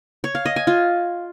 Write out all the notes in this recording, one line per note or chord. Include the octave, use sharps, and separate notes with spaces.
C#5
F5
D#5
G#5
F4